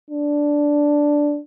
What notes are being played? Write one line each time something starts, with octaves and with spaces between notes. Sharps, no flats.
D4